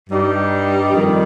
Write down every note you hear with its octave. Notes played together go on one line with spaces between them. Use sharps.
G2 G3 D#4 G4
F2 D#3 G3